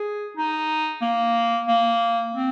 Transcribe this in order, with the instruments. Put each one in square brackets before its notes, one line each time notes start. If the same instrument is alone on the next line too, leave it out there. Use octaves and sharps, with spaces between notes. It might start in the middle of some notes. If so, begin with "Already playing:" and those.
Already playing: [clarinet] G#4
D#4
A#3
A#3
C4